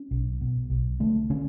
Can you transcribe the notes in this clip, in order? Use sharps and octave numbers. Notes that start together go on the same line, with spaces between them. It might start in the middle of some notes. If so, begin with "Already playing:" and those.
Already playing: C#4
B1
B2
B1
D3 A3
D3 C#4